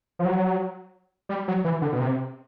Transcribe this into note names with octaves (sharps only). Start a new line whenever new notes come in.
F3
F#3
G3
F#3
E3
D3
B2
C3